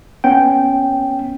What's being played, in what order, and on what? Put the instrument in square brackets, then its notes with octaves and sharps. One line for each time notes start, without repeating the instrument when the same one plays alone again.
[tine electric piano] B3 C#4 G5